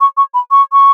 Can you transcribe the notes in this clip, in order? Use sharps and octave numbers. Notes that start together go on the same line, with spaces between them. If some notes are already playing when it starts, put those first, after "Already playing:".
C#6
C#6
B5
C#6
C#6